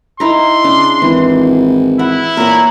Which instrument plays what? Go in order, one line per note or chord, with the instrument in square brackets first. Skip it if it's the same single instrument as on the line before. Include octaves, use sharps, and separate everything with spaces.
[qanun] D#4 E4 A#4 [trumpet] C6
[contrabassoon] C#3 [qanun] D4
[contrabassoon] G#1 [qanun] E3
[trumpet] E4 [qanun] F#5
[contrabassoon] A#2 [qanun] A#4 C#5 F#5